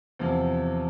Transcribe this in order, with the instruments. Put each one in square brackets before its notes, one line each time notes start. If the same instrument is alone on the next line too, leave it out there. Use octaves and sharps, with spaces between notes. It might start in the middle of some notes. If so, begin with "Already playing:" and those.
[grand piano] E2 C3 F3